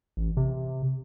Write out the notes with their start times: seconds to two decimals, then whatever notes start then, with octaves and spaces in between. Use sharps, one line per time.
0.17 A1
0.37 C3